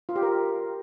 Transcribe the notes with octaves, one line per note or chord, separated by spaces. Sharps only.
F4
G4
A#4